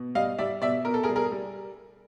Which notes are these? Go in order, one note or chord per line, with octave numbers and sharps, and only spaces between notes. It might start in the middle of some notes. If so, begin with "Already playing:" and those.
Already playing: B2
G3 D#5 F5
G3 D5 E5
B2 D5 E5
B2 A#4
A4
G#4 A#4
G3
G#4 A#4
G3